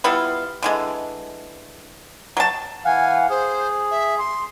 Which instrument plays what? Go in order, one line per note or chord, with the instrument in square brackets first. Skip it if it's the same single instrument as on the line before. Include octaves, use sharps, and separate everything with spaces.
[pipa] G3 B3 E4 F4
D3 E3 G#3
F#3 A5
[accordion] E3 F5 F#5 [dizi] G#5
[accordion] G#4 [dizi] C5
[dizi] E5
C6